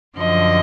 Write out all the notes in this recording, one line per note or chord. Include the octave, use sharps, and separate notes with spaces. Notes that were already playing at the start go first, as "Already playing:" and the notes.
F#2 D3 F3 D#5